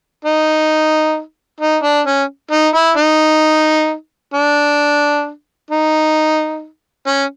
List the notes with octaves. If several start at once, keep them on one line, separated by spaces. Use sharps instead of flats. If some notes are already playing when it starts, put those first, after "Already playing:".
D#4
D#4
D4
C#4
D#4
E4
D#4
D4
D#4
C#4